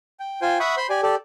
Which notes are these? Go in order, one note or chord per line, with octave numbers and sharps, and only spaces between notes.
G5
F4 C5 G5 G#5
E5 F#5 B5 C#6 D#6
C5 B5 C6
G4 D5 G#5
G4 A4 D5